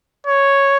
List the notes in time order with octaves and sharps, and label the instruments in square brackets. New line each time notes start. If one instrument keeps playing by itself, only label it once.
[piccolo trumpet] C#5